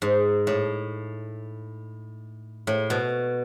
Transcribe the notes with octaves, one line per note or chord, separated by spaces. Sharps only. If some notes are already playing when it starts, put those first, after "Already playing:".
G#2
A2
A2
B2